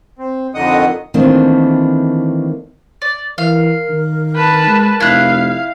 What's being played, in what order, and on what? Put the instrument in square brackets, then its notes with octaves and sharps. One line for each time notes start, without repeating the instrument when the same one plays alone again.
[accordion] C4
F2 D3 D#3 D#5 F#5 D#6
[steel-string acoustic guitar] D#3 E3 A3 A#3 C4 D4
[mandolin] D5
[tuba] E3 [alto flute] A#4 [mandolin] F5
[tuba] D#3
[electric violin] B4 A5
[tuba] G#3
[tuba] F1 [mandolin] E4 F#6 [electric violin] F5